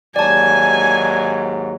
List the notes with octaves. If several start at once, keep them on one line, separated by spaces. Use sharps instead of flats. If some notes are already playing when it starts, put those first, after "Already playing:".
D#2 G#2 F#3 D5 G#5 A5